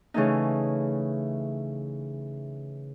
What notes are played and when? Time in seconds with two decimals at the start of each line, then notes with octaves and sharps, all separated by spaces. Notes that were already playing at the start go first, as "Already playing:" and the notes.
0.14 C#3 E3 A3 D#4